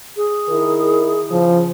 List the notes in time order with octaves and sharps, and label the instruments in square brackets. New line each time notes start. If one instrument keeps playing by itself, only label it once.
[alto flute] G#4
[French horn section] D#3 E4 A#4
C#3 F3